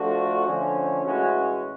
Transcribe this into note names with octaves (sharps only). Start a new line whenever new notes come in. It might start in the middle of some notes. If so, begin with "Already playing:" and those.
Already playing: F3 A3 D4 F#4 A4
D3 F3 A3 C#4
A2 E3 G#3 C#4 F#4